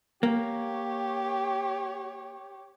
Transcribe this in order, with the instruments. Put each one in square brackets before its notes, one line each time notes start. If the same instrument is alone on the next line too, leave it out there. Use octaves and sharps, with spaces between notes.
[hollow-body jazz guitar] A#3 [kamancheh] G4 C#5